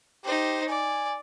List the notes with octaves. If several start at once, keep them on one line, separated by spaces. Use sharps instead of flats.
D#4 G4 C5
D5 G#5